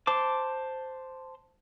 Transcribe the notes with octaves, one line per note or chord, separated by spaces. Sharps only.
C5 A5 D6